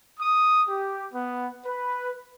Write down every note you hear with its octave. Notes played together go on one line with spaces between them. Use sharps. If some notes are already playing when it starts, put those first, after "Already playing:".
D#6
G4
B3
B4